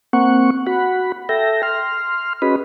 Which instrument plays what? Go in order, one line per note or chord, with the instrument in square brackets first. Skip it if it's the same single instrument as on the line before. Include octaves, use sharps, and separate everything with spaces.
[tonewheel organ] A#3 C4 F#5 C#6
F#4 F#5 B5
A4 E5 G5 A#6
C6 F6
C#4 F#4 G#4 B4 D#5 B5